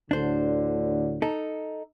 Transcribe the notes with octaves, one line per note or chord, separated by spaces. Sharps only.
D2 A2 D3 D4 C5
D#4 A4